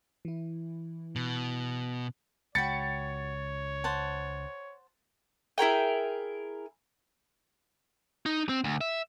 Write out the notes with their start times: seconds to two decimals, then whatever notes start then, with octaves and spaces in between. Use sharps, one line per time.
0.25 E3 E4
1.16 B2
2.55 C#2 F#4 C#5 G5 B5 A6 C#7
3.84 C5 F#5 A5
5.58 E4 G#4 A#4 G5
8.26 D#4
8.49 C4
8.64 D2
8.81 E5